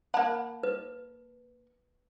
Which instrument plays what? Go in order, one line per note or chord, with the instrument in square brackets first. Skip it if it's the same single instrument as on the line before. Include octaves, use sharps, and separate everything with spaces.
[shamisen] A#3 F#5 [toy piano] A5 B5
[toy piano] B4